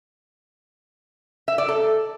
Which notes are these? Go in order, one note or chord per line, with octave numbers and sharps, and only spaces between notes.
E5
D5
A4